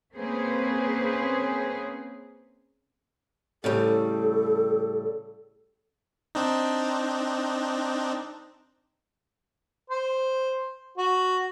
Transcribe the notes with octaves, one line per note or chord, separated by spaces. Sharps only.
A#3 C4 C#4 G#4 B4 C5
A2 C#3 G3 A4
C4 D4 D#4
C5
F#4